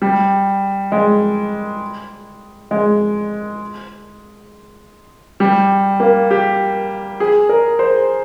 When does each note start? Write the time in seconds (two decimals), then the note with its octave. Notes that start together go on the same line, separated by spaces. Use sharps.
0.02 G3
0.92 G#3
2.71 G#3
5.40 G3
6.00 A#3
6.31 G4
7.20 G#4
7.49 A#4
7.79 C5